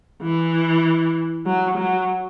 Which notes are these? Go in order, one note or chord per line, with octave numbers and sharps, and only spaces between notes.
E3
F#3
F#3